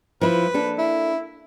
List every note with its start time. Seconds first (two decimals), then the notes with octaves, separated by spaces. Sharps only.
0.21 F3 E4 B4
0.54 A#3 D4 A4
0.78 E4